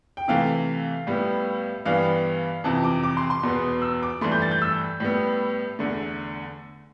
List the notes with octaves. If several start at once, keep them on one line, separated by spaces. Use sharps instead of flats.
G5
C3 E3 A3 F5
A2 G3 B3
G2 E3 G3 B3 F5
F2 C3 E3 A5
D6
D6
C6
C6
E2 B2 B3
E6
D6
G2 E3 A3 C6
G6
A6
G6
E6
A2 G3 B3
E2 D3 A3